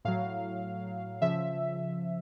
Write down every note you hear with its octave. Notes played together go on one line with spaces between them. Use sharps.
A2 F#3 F5
C#3 F3 E5